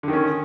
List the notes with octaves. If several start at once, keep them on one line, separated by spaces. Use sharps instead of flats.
D3 D#3 C#4